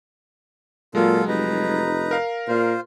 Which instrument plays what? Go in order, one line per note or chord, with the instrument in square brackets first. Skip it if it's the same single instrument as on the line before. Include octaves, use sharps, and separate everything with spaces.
[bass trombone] A#2 [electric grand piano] F#3 G#3 [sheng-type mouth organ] F4 A4
[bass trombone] F1 [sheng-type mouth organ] D#4 B4 A#5
[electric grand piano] A#4 F5
[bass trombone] A#2 [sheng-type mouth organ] F4 C5